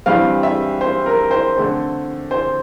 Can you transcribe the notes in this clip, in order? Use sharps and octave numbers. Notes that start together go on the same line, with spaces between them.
G2 E3 G3 C4 F5
E5
C5
A#4
C5
D3 A3 C4
C5